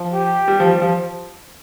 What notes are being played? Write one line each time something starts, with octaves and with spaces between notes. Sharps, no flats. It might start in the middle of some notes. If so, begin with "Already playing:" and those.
Already playing: F3
G4
G3
F3
G3
F3